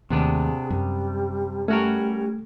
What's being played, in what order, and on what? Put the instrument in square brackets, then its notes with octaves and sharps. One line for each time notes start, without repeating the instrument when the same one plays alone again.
[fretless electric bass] D#2 A2 [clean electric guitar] C3 B3 D4 [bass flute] G#4
[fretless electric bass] F#2 [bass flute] G3
[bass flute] G3 [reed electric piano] A3 [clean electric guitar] C#4 F#4 A#4